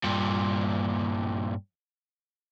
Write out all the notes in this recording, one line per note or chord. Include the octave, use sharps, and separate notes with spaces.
G2 A#2